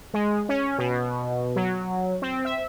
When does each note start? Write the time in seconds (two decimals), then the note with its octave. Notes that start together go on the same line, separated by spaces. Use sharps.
0.14 G#3
0.49 C#4
0.78 B2
1.56 F#3
2.22 C4
2.45 E5